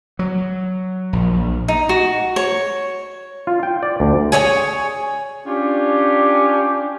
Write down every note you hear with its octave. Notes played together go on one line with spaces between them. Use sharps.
F#3
A#1
D#4
F#4
C#5
F4
G5
D5
D2
G#4 C#5 G5 G#5
C#4 D4 F4 G4